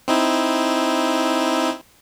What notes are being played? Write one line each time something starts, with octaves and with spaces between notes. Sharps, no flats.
C4 D#4 E4